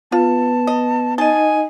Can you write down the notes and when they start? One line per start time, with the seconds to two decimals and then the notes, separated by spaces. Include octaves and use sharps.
0.12 B3 F4 A5
0.67 D#5
1.18 D#4 D#5 G#5 A5